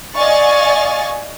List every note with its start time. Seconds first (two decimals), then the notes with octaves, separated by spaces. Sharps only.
0.17 D5 D#5 F5 G#5 C#6 A6